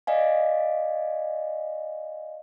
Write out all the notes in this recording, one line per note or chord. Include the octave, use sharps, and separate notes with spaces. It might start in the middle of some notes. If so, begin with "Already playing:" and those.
D5 D#5 F5 G#5